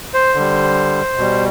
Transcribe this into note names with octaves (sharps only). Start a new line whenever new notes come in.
C5
D3 G3
B2 G3